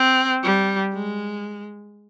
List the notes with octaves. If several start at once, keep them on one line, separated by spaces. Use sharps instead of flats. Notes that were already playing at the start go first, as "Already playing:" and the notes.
Already playing: C4
G3
G#3